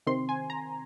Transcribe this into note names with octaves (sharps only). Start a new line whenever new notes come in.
C3 D#3 C4 C6
G#5
A#5